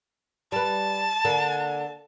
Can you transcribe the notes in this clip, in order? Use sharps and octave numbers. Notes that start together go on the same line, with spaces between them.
G3 B4 A5
D3 A#3